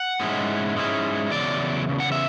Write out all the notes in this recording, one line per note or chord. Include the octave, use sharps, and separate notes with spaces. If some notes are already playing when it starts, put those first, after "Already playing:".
Already playing: F#5
G#2 G#3 C#4 E4
G#2 G#3 C#4 E4
E2 C#3 F#3 D5
E2 C#3
F#5
E5